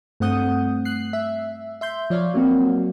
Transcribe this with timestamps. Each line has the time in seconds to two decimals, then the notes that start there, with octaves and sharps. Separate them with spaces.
0.20 G2 A3 C4 F#5 D#6 G6
0.85 F#6 C7
1.13 E5
1.81 E5 C6 G6
2.10 F3 C#5 D5 F5
2.34 F#3 A#3 C4 F#4